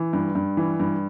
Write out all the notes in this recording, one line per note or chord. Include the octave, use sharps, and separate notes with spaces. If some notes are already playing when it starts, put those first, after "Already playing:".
Already playing: E3
G2
G2
E3
G2